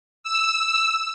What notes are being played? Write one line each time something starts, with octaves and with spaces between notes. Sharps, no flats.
E6